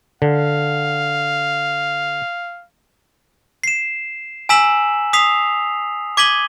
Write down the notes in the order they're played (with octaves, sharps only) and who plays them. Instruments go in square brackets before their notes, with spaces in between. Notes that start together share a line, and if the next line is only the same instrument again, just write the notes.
[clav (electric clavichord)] D3 [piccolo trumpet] F5
[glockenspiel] C7 E7
G#5 A#5 E6 B6 E7 F#7
D#6 B6 C7 F7
D6 G#6 B6 D#7 F#7 G7